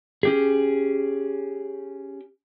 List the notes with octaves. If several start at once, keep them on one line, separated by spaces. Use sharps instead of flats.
C#4 G4 G#4